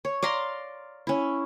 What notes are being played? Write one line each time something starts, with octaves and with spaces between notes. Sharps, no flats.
C#5
D5 F5 A#5 C6
C#4 E4